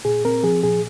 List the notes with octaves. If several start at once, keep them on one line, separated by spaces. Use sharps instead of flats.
A#2 G#4
C4 A#4
F3 G#4
A#2 G#4